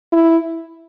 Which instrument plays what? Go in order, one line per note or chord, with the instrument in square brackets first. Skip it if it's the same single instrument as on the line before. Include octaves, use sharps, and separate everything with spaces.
[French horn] E4